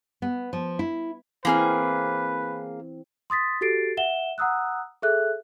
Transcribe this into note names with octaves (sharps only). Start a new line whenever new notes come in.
B3
F3
E4
E3 A#3 C4 G#4 B4 F6
C6 D#6 A6 B6
F#4 G4 A4 A6 C7 D7
E5 F#5 E7 G7
F#5 A#5 D#6 E6 F#6
G#4 A4 E5 F#6